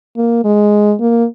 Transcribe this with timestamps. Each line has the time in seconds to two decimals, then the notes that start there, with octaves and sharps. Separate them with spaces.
0.17 A#3
0.44 G#3
1.00 A#3